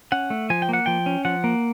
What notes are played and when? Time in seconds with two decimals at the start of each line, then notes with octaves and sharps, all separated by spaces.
0.12 C#4 F#5
0.30 A3
0.50 F3 G#5
0.62 G5
0.69 A#3 F#5
0.86 F3 G5
1.06 C#4
1.25 F3 F#5
1.44 A#3